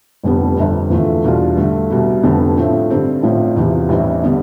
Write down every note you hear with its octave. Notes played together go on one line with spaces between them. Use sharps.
F1 F2 D3 G3 B3
G1 F2 D3
E2 D3 F3 A3
E2 B2 G3 D4 F4
G2 D3 A3
C2 B2 G3
F1 F2 D3 G3 B3
A2 F3 A3 C4
G2 D3 G3 C4
A1 A2 F3
E2 C3 F3
A1 G2 E3 G3 C4
D3 G3 B3